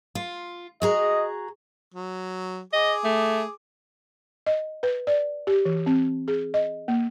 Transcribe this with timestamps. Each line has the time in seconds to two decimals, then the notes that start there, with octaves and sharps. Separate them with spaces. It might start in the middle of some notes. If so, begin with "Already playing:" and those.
0.15 F4
0.82 F#4 G#4 D#5 A#5
1.94 F#3
2.73 G#4 D#5 D6
3.04 A3
4.46 D#5
4.83 B4
5.07 D5
5.47 G4
5.65 E3
5.86 C4
6.28 G#4
6.54 D#5
6.88 A#3